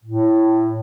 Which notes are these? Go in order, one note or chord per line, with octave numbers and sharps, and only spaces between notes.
A2